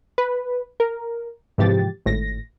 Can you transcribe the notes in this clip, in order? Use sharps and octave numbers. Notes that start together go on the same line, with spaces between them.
B4
A#4
G#2 C3 E3 F3 G4 A6
G#1 A2 A#6